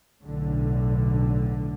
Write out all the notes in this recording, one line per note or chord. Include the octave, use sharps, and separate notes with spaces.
B1 A2 D3